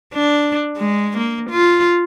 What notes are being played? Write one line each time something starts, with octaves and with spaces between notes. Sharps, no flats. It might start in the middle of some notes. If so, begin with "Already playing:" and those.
D4
G#3
A#3
F4